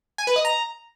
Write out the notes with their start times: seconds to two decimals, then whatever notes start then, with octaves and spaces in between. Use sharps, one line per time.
0.18 G#5
0.27 B4
0.36 D#5
0.45 A#5